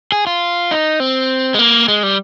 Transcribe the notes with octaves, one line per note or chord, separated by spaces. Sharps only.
G#4
F4
D#4
C4
G#3
A#3
G#3
G3